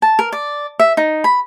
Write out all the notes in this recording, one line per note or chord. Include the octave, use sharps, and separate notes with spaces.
A5
A#4
D5
E5
D#4
B5